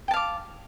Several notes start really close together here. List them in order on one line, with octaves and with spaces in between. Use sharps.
G5 A5 F5 D6